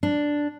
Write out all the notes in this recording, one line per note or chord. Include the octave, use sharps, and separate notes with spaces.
D4